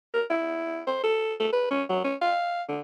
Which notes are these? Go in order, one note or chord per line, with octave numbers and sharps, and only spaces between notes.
A#4
E4
C5
A4
A4
B4
C#4
F#3
C#4
F5
D3